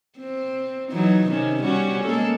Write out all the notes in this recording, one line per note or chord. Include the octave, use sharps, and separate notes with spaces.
C4
E3 F#3 D#4
C3 D#3 C#4
G3 C#4 F#4
G#3 A#3 A4